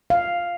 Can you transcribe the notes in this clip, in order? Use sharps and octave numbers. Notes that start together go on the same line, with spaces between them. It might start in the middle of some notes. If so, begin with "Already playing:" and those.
F5